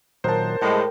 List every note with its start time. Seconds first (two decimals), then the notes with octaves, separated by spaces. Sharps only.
0.24 A#2 D#3 F#3 A#4 C5 A5
0.61 A2 G3 G#3 G5